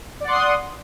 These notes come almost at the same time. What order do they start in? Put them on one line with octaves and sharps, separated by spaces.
D5 F#5 C6 D#6